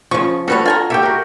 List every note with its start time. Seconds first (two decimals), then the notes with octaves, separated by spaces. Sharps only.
0.11 C#3 F3 C#6
0.48 G3 F#4 A4 B4 C#5
0.66 F4 G#5 A#5
0.90 G4 C#5 E5 G5
1.03 F#4 A#4